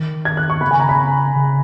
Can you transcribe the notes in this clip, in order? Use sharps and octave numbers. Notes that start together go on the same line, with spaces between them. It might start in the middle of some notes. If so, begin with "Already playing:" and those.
Already playing: D#3
G#6
F#6
C#6
C#3 B5
G#5
A#5
B5
C#3